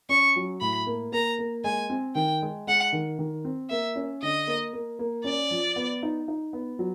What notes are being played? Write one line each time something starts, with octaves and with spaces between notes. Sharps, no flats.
C#4 C#6
F#3
A2 B5
A#3
A#3 A#5
A#3
G#3 G#5
C4
D#3 G5
G#3
G#3 F#5
D#3
D#3
C4
A#3 E5
C#4
D3 D#5
A#3
A#3
A#3
C#4 D5
F3
B3
D#4
D#4
B3
F#3